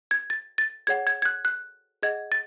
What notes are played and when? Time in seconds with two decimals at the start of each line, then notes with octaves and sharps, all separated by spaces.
0.11 G#6
0.30 A6
0.58 A6
0.87 G#4 C#5 F#5 G#6
1.07 G#6
1.22 G#6
1.25 F#6
1.45 F#6
2.03 G#4 D#5 F#5 G#6
2.32 A6